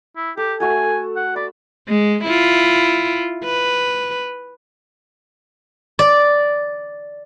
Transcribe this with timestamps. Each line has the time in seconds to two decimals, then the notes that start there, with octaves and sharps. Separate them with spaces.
0.16 E4
0.37 G4 A4
0.60 A3 F#4 A4 G#5
1.16 F#5
1.36 D5 B5
1.89 G#3
2.24 E4 F4
3.44 B4
5.99 D5